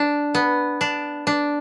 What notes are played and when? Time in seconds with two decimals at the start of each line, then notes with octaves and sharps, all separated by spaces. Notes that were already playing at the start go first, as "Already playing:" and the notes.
Already playing: D4
0.35 B3
0.81 D4
1.27 D4